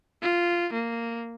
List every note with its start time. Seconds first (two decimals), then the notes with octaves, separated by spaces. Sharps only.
0.22 F4
0.73 A#3